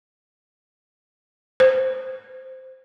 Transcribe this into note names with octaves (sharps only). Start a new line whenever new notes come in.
C5